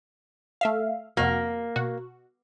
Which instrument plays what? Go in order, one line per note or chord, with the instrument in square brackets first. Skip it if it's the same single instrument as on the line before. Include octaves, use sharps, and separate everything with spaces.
[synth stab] A3 E5 F5
[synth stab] F2 C3 F#4 [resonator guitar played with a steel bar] A#3
[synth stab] B2 F#4